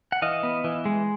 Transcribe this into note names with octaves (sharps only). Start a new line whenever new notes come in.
F#5
E3 D#5 F5
B3
E3
G#3